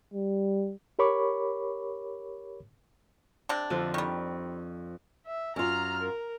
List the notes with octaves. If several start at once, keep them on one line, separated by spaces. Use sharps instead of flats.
G3
G4 A#4 C#5 B5 C#6 D6
C3 D4
F2 D3 F4
D#3 G3 C#6
E5
F#2 F4 A#5 F6
A#4